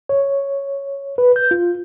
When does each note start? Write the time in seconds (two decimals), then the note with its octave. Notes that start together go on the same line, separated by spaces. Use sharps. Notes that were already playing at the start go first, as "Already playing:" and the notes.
0.09 C#5
1.18 B4
1.36 G6
1.51 F4